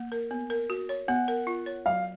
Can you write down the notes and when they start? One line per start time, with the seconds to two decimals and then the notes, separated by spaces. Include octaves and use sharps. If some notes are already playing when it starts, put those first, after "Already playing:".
Already playing: A#3
0.12 A#4
0.31 B3
0.50 A#4
0.70 F#4
0.89 C#5
1.08 B3 F#5
1.28 A#4
1.47 F4
1.66 C#5
1.86 F#3 F5